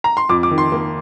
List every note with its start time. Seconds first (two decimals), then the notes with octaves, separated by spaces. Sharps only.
0.04 A#5
0.17 C6
0.29 F2 D6
0.43 D6
0.51 D#3
0.58 C6
0.72 A#3